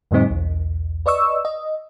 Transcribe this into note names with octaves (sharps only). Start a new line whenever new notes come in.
F2 A2 D3 G3 C4 D#4
B1 E2
B4 D5 D#5 C#6 E6
D#5